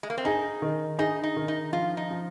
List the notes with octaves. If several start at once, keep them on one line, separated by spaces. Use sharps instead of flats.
G#3
A#3
C4
D#4 G#4
D#3
D#4 G#4
D#4
D#3
D#4
F3 F4
D#4
F3